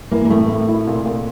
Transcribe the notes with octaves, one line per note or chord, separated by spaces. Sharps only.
E3 A#3
A#3
A2 A3
A2
E4
A#2
A#2